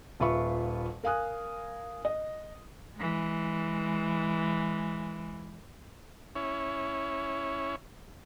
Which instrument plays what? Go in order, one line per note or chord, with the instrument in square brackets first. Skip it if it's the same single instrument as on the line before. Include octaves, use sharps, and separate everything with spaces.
[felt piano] D#1 F4 B4 E5 B5 C#6
A#4 F5 G#5 D#6 F#6
D#5
[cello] E3 G#3
[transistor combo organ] C#4 E4 C#5